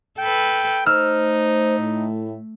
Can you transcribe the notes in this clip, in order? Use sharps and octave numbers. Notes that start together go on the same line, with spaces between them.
A4 B4 G5
A3 D#4 C5 E6 F6
A2